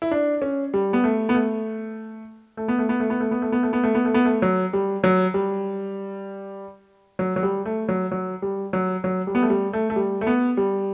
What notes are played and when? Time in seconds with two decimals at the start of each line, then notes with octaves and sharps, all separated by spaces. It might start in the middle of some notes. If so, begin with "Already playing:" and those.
0.02 E4
0.11 D4
0.42 C#4
0.74 G3
0.93 B3
1.04 A3
1.29 B3
1.35 A3
2.57 A3
2.68 B3
2.79 A3
2.89 B3
3.00 A3
3.10 B3
3.20 A3
3.31 B3
3.42 A3
3.52 B3
3.63 A3
3.73 B3
3.83 A3
3.95 B3
4.05 A3
4.14 B3
4.25 A3
4.42 F#3
4.73 G3
5.04 F#3
5.34 G3
7.19 F#3
7.36 F#3
7.43 G3
7.65 A3
7.89 F#3
8.12 F#3
8.42 G3
8.73 F#3
9.04 F#3
9.27 G3
9.35 B3
9.42 A3
9.50 G3
9.73 A3
9.90 A3
9.96 G3
10.21 A3
10.27 B3
10.57 G3